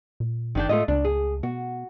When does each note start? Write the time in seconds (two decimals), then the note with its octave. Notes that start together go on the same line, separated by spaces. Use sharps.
0.20 A#2
0.55 G1 D#3 D4 G5
0.69 A2 A3 F4 D#5
0.88 C#2 D4
1.05 G#4
1.43 B2 F#4